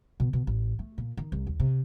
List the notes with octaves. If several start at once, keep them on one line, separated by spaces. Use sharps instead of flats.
B2
B2
A1
A3
A#2
D#3
C2
D#2
C3